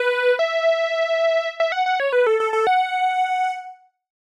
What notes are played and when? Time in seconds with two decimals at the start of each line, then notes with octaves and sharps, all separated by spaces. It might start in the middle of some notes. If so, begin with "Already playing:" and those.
Already playing: B4
0.39 E5
1.60 E5
1.72 F#5
1.86 F#5
2.00 C#5
2.13 B4
2.27 A4
2.40 A4
2.53 A4
2.67 F#5